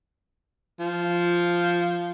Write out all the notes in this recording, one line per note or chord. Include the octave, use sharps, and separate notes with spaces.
F3